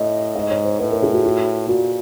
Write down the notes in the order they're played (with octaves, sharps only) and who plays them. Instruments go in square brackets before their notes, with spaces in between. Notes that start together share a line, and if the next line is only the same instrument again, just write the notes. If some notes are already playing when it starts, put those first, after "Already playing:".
Already playing: [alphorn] A2 [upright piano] D#5
[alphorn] G#2 [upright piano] D#5
[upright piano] C#5
C5
[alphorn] A2 [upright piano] B4
[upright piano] A#4
G#4
F#4
F#4
[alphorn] A#2 [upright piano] F#4